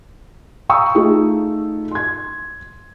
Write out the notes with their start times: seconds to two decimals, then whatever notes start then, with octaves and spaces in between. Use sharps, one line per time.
0.69 F5 G5 A#5 C#6 D#6 E6
0.95 A3 D#4 F4 G#4
1.91 C6 G#6